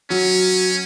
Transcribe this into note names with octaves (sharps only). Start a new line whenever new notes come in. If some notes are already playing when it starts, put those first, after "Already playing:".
F#3 C#4